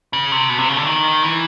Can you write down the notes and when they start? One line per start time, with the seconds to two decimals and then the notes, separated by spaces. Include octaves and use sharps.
0.13 C#3
0.32 C3
0.50 B2
0.58 C3
0.69 C#3
0.77 D3
0.87 D#3
1.23 E3